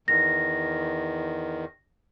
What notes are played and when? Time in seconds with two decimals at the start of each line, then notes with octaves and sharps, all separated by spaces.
0.08 E2 D#3 A#6